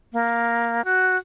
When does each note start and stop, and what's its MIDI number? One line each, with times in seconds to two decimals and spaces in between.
0.13 0.84 58
0.84 1.17 66